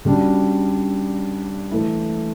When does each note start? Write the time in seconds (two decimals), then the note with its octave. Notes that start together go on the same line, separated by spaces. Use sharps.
0.05 C#3 G3 D4 F#4
1.71 E3 A3 E4